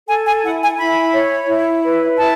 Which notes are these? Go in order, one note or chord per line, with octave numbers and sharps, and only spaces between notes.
A4 G#5
G#5
E4 F#5
G#5
E4 B5
C#5
E4
B4
E4 A5